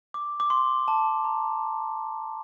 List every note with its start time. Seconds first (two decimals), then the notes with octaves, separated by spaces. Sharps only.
0.14 D6
0.40 D6
0.50 C6
0.88 A5
1.24 A#5